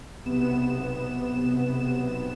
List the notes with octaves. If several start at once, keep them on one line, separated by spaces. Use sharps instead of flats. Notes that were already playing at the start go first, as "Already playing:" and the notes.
B1 C3 B3 E7